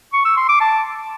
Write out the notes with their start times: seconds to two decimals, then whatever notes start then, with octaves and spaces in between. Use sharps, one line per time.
0.13 C#6
0.25 E6
0.37 C6
0.49 D6
0.61 A5